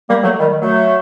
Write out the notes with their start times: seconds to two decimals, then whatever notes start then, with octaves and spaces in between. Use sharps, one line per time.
0.09 G3 A#3
0.23 F#3 A3
0.39 D#3 G3
0.62 F#3 A3